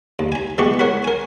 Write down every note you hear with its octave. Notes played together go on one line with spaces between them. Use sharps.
D#2
G#5 A#5
E3 G#3 B3 G4 C#6
A#4 C#5 F#5 B5
A#4 G#5